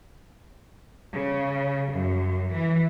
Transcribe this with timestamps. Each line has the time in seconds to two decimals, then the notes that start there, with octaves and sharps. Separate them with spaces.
1.13 C#3
1.91 F#2
2.53 E3